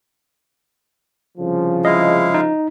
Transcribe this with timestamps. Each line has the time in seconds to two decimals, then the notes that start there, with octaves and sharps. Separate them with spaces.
1.38 C2 C#3 F3
1.85 G#3 E4 D#5 F5
2.34 D#4